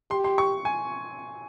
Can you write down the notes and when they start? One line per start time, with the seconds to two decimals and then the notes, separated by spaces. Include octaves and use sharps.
0.11 G4 C6
0.24 C6
0.38 C#6
0.65 G#5